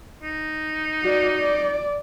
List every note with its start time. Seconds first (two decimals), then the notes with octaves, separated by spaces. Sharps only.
0.23 D#4
1.02 F#4 D5
1.38 D5